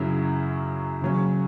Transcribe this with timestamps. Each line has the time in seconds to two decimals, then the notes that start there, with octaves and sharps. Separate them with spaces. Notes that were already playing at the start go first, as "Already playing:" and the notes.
Already playing: F#2 C#3 F#3 C#4 E4
1.02 C#3 F#3 C#4